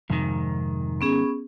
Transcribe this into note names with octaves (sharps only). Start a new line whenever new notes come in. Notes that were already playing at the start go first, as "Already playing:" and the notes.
F2 G#2 C3 D#3 F3
B3 C#4 G#4